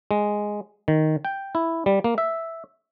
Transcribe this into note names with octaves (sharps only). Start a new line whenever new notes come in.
G#3
D#3
G5
E4
G3
A#3
E5